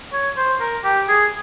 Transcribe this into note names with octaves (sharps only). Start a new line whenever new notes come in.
C#5
C5
A#4
G4
G#4